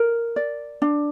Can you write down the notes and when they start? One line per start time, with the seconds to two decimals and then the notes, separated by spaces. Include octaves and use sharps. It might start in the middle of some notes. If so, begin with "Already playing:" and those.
Already playing: A#4
0.36 D5
0.82 D4